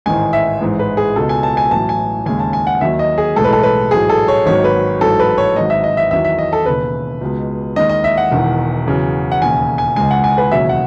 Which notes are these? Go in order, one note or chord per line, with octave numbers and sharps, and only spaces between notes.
A1 G#2 D#3 G#3 G#5
E5
A1 G#2 E3 G#3
B4
G#4
C#2 B2 G#3 A4
G#5
A5
G#5
A1 A2 F#3 A5
G#5
D#2 C#3 G#3 G#5
A5
G#5
F#5
D#2 D#3 F#3 E5
D#5
G#4
B1 A2 E3 G#3 A4
B4
A4
B4
A1 G#2 F#3 G#4
A4
C#5
G#1 G#2 D#3 F#3 C#5
B4
A1 G#2 F#3 A4
B4
C#5
G#1 G#2 F#3 D#5
E5
D#5
E5
E2 D#3 F#3 E5
E5
D#5
A4
E1 D#2 C#3 B4
C#2 B2 G#3
D#2 D#3 G#3 D#5
D#5
E5
F#5
E1 E2 D#3
E2 C#3 F#3
F#5
E1 D#2 C#3 G#5
G#5
C#2 C#3 G#3 G#5
F#5
G#5
B4
E1 D#2 C#3 F#3 E5
F#5